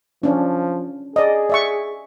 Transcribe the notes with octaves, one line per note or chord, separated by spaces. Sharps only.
F3 C#4 D4
G#4 D5 D#5
D5 E5 C#6